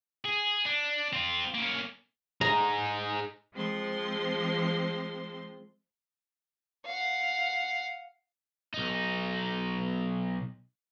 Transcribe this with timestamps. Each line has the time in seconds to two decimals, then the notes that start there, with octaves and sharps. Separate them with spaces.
0.25 G#4
0.65 D4
1.13 C4 F4
1.55 A#3 C#4
2.41 D#4 G#4 A#5
3.55 F3 G#3 C4 C6
6.86 F5 F#5
8.74 B1 D#4